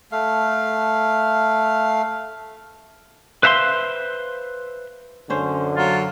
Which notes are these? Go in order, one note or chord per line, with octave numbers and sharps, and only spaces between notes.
A3 F5
B4 C5 E5 F5 G5 C6
F#2 D3 C#4 C5
F#3 F4